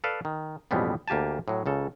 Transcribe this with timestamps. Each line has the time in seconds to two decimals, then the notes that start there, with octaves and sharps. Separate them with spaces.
0.04 A4 B4 D5 F5
0.25 D#3
0.71 A1 F2 B2 G3 G#3 B3
1.08 D2 A#3 G4 G#5 A5
1.48 A2 F#3
1.66 C#2 C#3 A4